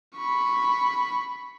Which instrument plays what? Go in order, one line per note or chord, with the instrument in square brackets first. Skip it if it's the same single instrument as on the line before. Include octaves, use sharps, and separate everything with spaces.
[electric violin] B5 C#6